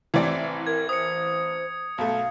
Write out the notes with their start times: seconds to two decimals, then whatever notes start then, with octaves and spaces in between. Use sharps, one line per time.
0.14 A1 E3 C4 D5
0.67 A#4 G#6
0.89 C5 D#6 C#7
1.98 B1 A3 F5